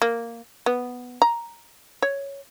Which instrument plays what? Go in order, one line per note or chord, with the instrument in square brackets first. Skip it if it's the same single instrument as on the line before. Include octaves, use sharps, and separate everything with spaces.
[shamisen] A#3
B3
A#5
C#5